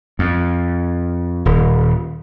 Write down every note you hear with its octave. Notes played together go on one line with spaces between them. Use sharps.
F2
D#1